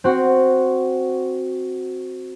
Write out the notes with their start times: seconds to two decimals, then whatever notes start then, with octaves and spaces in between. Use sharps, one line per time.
0.04 C4 F#4